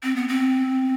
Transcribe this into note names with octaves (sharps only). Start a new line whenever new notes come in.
C4
B3
C4